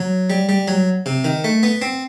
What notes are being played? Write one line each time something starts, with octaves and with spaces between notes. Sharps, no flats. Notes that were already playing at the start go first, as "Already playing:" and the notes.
Already playing: F#3
G3
G3
F#3
C3
D#3
A3
B3
C4